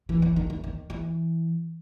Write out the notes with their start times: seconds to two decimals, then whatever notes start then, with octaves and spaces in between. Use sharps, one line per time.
0.09 E3
0.22 E3
0.36 D#3
0.50 E3
0.64 D#3
0.90 E3